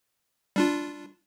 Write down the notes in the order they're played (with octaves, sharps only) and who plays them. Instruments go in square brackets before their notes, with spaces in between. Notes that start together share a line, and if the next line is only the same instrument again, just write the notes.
[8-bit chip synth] G3 D4 F4